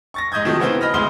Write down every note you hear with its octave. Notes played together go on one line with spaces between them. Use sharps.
C#6 A6 A#6
G#2 D#5 D#6 G6 G#6
C3 D#3 F3 F#3 A3
C#3 B3 C4 E4 B4 G7
D#5 B5 F6 A#6
D2 G#3 B3 C6 D#6 G7